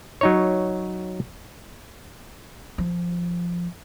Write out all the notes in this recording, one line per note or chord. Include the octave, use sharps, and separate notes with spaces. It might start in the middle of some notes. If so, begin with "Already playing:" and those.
F#3 D#4 C#5
F3